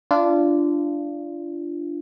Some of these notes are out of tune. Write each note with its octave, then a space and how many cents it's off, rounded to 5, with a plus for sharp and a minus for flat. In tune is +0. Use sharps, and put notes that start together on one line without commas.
D4 -5 F4 -30